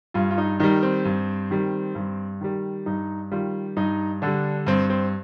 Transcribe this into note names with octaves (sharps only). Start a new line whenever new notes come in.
G2 F4
F4
D#4
D#3 G3 D#4
C4
G2
D#3 G3
G2
D#3 G3
G2 D#4
D#3 G3 F4
G2 D#4
D3 G3 D4
G2 C4
C4